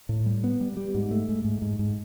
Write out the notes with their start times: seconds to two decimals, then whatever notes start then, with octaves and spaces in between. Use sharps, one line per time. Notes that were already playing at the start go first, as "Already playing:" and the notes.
0.09 A2
0.26 G3
0.44 B3
0.61 G3
0.77 G3
0.94 G#2
1.11 A3
1.29 G#2
1.45 G#2
1.62 G#2
1.79 G#2